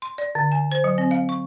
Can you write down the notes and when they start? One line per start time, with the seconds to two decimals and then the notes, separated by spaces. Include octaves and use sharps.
0.02 C6
0.18 D5
0.35 D3
0.52 G#5
0.72 C5
0.84 F#3
0.98 C4
1.11 F5
1.29 C#6